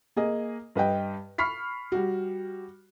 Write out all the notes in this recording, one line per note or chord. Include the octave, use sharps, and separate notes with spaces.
A#3 G#4 D#5
G2 B4 D#5 G5
B5 C#6 F6 B6 C7
G3 F#4